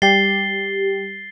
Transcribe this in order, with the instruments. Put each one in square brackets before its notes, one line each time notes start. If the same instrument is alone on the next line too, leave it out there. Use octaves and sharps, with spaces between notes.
[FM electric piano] G3 G4 [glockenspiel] A6 C7 G7